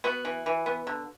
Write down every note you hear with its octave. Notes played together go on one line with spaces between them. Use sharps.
B3 F#4
E3
E3
B3
D3